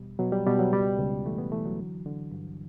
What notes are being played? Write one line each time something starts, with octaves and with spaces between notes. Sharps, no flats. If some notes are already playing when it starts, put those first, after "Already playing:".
Already playing: E2 B2 G3
B2 F#3
G3
B2 G3
F#3
C#2 G3
C#2
E3 A3
B3
E3 A3
F#3
D3
D3
G2